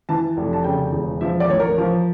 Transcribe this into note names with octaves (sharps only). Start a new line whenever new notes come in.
E3 A5
F1
A5
C#3 G5
E1
F3 E5
D5
A1 C#5
A#4
F3